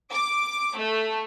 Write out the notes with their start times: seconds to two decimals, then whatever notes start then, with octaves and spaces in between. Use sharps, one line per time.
0.12 D6
0.78 A3